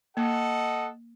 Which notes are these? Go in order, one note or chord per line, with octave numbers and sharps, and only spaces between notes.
A#3 A4 D#5 F#5